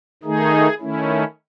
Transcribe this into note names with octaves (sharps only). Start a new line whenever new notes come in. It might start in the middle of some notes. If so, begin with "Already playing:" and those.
D#3 A3 D#4 G#4
D#3 A3 C#4 E4